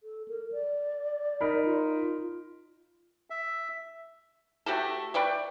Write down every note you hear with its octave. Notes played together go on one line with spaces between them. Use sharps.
A4
A#4
D5
D#4 A#4 B5
F4
E5
A3 F#4 G4 A4
B4 D5 G5 C#6